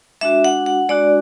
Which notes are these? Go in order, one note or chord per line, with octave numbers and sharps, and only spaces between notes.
G#3 D4 F#4 E5
F#5
F#5
G#3 D4 F#4 D5